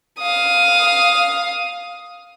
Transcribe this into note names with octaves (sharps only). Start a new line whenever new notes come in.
F5 D#6